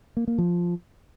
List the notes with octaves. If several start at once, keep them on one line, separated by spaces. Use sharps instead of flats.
A#3
A#3
F3